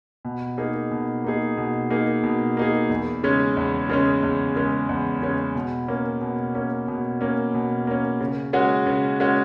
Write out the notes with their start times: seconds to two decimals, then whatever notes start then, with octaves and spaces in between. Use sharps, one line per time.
0.25 B2
0.58 A#3 D#4 G#4
0.91 B2
1.24 A#3 D#4 G#4
1.57 B2
1.90 A#3 D#4 G#4
2.24 B2
2.57 A#3 D#4 G#4
2.90 E2
3.23 C#3 G#3 C#4
3.57 E2
3.89 C#3 G#3 C#4
4.23 E2
4.56 C#3 G#3 C#4
4.89 E2
5.22 C#3 G#3 C#4
5.55 B2
5.88 A#3 C#4
6.21 B2
6.55 A#3 C#4
6.88 B2
7.21 A#3 C#4
7.54 B2
7.87 A#3 C#4
8.20 C#3
8.53 G#3 C#4 F#4
8.86 C#3
9.20 G#3 C#4 F#4